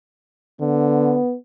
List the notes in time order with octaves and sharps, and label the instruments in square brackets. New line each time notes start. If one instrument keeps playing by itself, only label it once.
[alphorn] D3 [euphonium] B3